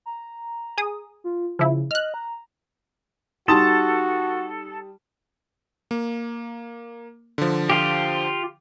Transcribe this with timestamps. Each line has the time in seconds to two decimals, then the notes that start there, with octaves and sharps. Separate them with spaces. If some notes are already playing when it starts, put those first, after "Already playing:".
0.06 A#5
0.78 G#4 D#6
1.24 F4
1.59 C#3 F3 E4
1.91 D#5 F6 F#6
2.14 A#5
3.48 G3 D#4 F#4 A4 A5 C6 D#6 E7
5.91 A#3
7.38 D3 F3
7.70 F4 G4